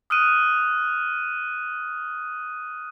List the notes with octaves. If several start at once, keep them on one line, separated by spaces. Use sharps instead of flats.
D#6 F6 F#6 D#7